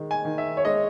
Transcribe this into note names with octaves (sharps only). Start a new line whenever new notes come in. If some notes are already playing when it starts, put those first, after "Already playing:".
Already playing: D#3 G#3
G#5
D#3
E5
C#5
G#3 D#5